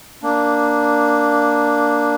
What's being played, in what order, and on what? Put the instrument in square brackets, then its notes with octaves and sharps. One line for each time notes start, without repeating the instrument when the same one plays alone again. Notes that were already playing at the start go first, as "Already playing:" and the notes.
[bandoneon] A#3 D4